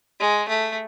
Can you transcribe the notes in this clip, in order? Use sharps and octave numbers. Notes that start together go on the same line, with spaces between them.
G#3
A3